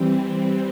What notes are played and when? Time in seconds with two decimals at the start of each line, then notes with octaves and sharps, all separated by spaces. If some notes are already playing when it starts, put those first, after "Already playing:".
Already playing: E3 G3 C4